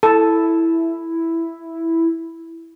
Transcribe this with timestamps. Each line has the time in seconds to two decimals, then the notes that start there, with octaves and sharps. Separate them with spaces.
0.03 E4 A4